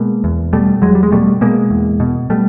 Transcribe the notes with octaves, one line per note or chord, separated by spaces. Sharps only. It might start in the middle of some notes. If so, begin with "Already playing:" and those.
Already playing: B2 G#3 A#3
E2
B2 G3 A3
E2 F#3 G#3
G3
G#3
B2 G3 A3
B2 G#3 A#3
E2
B2
B2 G3 A3